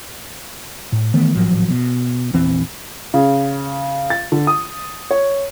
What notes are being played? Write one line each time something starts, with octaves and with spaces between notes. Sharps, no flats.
A2
D#3 E3 A3 B3
G#1 A2 F3 F#3
B2
A#1 E2 E3 C4
C#3
A6
D3
D#6
C#5